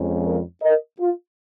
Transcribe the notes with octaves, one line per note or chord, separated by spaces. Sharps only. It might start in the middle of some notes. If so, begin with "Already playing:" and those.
Already playing: F2 F3 G#3 C#4
F4 A#4
A#4 D#5
F4